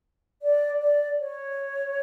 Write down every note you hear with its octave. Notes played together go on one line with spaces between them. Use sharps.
D5
D5
C#5